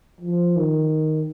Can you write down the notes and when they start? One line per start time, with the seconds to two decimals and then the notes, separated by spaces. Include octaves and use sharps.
0.21 F3
0.57 D#3